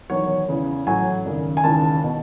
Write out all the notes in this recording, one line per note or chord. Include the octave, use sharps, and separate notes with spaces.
E1 E2 D#3 F#3 C#5
E2 C#3 E3
A1 A2 F#3 G#5
G#1 F#2 C#3
G#5
E1 D#2 C#3 E3 A5
B2